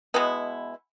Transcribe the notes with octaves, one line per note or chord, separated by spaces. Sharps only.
B2 G#3 B3 E4